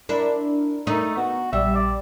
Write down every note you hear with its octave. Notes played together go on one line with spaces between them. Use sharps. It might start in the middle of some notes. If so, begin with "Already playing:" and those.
D4 E4 A#4
A3 D#4
B3 F#4
A#1 G3 E5
D5